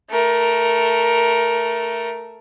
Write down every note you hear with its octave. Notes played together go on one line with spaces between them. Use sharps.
A3 A#4